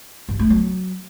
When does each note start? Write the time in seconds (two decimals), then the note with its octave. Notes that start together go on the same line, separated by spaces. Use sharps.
0.29 G2
0.39 A3
0.50 F#3